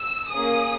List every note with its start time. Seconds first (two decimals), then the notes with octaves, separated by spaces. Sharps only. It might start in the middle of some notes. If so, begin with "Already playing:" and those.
Already playing: E6
0.31 A#3 C#4 G#4 D#6